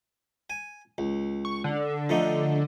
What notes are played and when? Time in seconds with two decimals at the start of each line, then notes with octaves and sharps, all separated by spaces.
0.50 G#5
0.98 C#2
1.45 C#6
1.64 D3
2.09 F3 A3 D#4